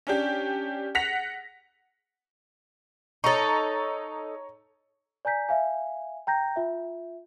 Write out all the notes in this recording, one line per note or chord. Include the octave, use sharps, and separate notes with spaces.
C#4 D4 G4
F#5 A#6 B6 F7
D#4 A4 C#5 A#5 C#6
D5 G#5 A#5 G6 B6
E5 F5 G#5
G5 A#5 G6 A#6
F4 E5